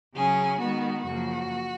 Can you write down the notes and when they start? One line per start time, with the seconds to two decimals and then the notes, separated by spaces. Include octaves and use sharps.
0.15 C#3 F#3 C#4 G#4
0.60 D#3 G#3 B3 F#4
1.05 F#2 C#3 F3 A#3 F#4